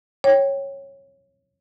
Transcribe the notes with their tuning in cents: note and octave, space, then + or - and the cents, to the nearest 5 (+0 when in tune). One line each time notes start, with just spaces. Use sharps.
C#5 -10 G5 +0